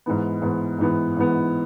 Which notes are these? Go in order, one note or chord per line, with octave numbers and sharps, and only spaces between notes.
G#2 E3 B3
G#2 E3 B3
G#2 E3 B3
G#2 E3 B3